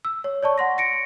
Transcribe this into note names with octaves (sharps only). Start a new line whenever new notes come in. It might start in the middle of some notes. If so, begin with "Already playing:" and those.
E6
C#5
C#5 D5 A5 C#6
F#5 C6 A#6
A#6 C#7 D7